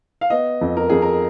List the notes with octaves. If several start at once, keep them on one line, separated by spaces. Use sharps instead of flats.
F5
B3 D#5
F2
A#4
F2 G#4
A#4